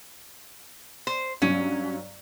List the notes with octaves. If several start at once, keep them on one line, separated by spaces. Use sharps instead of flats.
C5
G2 F#3 C#4